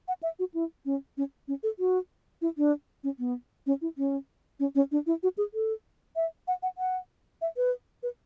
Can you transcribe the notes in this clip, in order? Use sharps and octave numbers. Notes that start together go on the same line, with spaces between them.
F#5
E5
F#4
E4
C#4
C#4
C#4
A4
F#4
E4
D4
C#4
B3
C#4
E4
C#4
C#4
C#4
D4
E4
F#4
G#4
A4
E5
F#5
F#5
F#5
E5
B4
B4